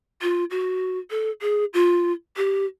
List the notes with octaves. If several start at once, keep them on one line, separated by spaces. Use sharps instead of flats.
F4
F#4
A4
G#4
F4
G4